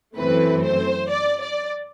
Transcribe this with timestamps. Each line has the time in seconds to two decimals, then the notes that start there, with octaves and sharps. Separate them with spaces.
0.16 F#2 E3 A3 C4 B4
0.63 C5
1.10 D5
1.41 D5